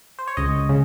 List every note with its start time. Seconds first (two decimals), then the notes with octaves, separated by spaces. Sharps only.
0.19 C5
0.28 C#5
0.37 C#2 D#5
0.69 C#3